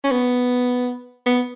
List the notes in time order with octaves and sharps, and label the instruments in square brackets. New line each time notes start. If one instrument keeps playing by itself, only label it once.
[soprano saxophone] C#4
B3
B3